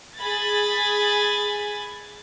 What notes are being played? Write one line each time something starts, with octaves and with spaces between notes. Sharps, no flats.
G#4 B5 G#6 A6